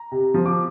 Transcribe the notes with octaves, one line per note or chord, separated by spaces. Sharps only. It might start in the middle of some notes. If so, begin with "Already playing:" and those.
Already playing: A#5
C3
F3
D6